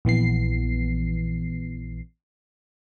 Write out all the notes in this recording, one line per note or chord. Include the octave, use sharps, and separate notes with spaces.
A#1 E3 B3 C7